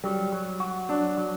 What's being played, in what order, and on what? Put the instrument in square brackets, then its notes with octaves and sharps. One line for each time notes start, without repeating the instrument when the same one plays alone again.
[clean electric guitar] F#3 [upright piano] G3
[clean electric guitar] F#3
F#4
[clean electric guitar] F#3 [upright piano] D4
[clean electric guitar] F#3